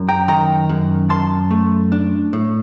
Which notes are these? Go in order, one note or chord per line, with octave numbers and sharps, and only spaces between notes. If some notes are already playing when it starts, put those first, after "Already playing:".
Already playing: F#2
G5 A#5
D#3 G5 A#5
F#2
F#2 A5 C6
A3
D4
A2